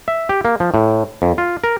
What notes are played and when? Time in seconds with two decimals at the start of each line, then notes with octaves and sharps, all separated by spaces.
0.08 E5
0.29 G4
0.45 A#3
0.60 F3
0.74 A2
1.22 F2
1.38 F4
1.64 A#4